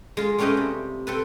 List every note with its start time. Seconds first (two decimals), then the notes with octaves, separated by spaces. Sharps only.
0.17 G#3 F4
0.38 G3 A3 C#4 G4 B4 D#5
0.57 C3
1.07 C4 A4 B4